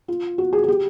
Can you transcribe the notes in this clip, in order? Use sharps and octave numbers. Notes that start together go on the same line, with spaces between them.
F4
F#4
G#4
G#4
G4